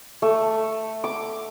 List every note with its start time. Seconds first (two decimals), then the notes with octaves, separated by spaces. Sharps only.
0.22 A3
1.04 D6